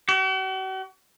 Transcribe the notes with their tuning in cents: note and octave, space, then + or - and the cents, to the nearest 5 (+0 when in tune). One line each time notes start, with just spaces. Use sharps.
F#4 +45